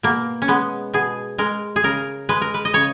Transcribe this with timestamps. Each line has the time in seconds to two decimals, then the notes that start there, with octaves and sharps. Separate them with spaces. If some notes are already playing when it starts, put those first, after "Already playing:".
0.03 B2 A#3
0.42 C#4
0.48 G#3 B3
0.94 B2 G#4
1.38 G#3 A#4
1.76 G#4
1.84 C#3 A#4
2.29 G#3 B4
2.41 A#4
2.54 B4
2.65 D#5
2.73 C#3 C#5